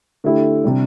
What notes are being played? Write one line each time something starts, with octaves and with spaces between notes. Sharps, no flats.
D3 A3 E4 G4
C3 G3 D4